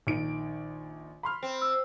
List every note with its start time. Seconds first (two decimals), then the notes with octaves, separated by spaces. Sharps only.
0.07 A#1 D#3 D7
1.23 B5 C6 F6
1.43 C4
1.62 E6